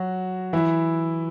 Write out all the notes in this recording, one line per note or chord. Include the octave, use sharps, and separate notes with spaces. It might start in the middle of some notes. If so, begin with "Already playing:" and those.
Already playing: F#3 F#4
E3 E4